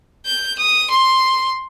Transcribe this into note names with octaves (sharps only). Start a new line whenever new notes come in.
G6
D#6
C6